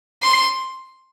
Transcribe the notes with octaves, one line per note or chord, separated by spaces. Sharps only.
C6